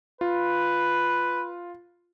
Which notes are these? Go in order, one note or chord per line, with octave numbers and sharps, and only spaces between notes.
F4 B4